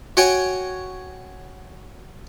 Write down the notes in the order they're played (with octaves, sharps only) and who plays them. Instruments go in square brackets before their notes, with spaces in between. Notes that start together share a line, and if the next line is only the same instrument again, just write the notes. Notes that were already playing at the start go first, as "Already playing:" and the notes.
[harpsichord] F#4 C#5 G5 G#5